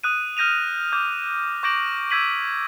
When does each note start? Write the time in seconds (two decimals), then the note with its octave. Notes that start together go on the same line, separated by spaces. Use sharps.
0.04 D#6 F#6 D#7
0.37 F6 G6 A#6 D#7 F7
0.92 D6 G6
1.63 C#6 D6 G6 A#6 D7 F#7
2.10 E6 G6 G#6 B6 D#7 F#7